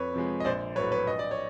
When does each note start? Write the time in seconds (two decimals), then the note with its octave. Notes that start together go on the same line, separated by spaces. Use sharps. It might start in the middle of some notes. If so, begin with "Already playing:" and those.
Already playing: F2 B4 C#5
0.14 C3 F3 G#3
0.40 D#5
0.45 A#1 C5 D5
0.76 A2 F#3 B4 C#5
0.92 B4 C#5
1.07 A#1 D#5
1.19 D5
1.31 C#5